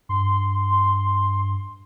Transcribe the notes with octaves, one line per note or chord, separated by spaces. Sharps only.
G2 C6